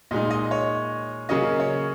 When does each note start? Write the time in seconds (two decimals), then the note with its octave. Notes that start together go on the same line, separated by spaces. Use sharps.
0.11 A#2 G#3 D#4 D#5
0.31 D#5
0.51 C#5
1.29 C#3 F#3 A#3 C#4 D#5
1.60 C#5